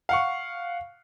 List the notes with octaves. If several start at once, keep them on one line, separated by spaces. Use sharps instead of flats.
F5 F#5 C#6